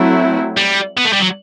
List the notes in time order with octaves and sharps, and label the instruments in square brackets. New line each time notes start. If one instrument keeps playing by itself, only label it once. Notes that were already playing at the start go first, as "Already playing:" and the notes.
Already playing: [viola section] F#3 A3 C4 E4
[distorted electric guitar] G3
B3
A3
G3
F#3